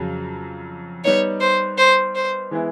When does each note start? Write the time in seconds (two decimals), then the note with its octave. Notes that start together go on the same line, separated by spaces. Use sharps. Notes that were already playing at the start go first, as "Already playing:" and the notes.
Already playing: F2 C#3 F#3
1.04 G3 B3 D#4 C#5
1.41 C5
1.78 C5
2.15 C5
2.51 E3 G#3 B3 E4